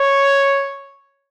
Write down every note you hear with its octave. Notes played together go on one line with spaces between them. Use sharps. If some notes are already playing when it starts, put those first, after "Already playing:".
Already playing: C#5